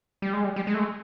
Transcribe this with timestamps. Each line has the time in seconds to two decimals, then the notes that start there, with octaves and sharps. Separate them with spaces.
0.22 G3
0.33 G#3
0.44 G3
0.56 G3
0.67 G#3
0.74 A3
0.79 G#3